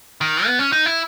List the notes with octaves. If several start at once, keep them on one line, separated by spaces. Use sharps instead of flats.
D#3
B3
C#4
D#4
E4